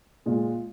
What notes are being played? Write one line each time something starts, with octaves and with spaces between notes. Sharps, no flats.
A#2 G#3 F4